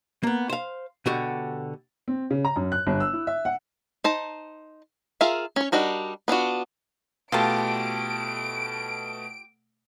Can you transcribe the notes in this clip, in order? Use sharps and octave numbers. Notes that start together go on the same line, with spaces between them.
A#3 B3
C5 F5
B2 D3 F#4 G4
C4
C#3
A#5
F#2
F#6
G1
E6
E4
E5
F#5
D#4 C5 A5
F4 G#4 A#4 E5 F5
C#4 C#5
G3 D4 D#4 F#4 A#4
B3 D4 F4 F#4
B2 A3 F4 G4 A5 D7